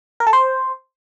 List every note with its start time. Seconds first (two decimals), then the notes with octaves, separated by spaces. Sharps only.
0.20 A#4
0.27 A4
0.33 C5